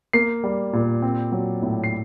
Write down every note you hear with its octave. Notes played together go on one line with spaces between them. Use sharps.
A#3 C7
G3
A#2
C4
F#3
A2
C7